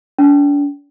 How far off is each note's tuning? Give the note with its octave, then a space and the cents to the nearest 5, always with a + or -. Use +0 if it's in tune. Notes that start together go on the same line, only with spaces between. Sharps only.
D4 -40